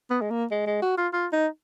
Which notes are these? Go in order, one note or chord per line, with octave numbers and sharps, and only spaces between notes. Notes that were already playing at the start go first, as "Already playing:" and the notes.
B3
G#3
A#3
G#3
G#3
F#4
F4
F4
D#4